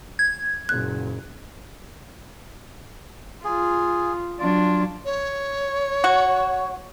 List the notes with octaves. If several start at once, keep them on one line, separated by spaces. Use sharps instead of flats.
G#6
F#1 A#2 F#6
F4 G#4
F#3 D4 F4
C#5
F#4